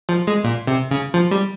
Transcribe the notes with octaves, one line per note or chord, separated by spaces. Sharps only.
F3
G#3
A#2
C3
C#3
F3
G3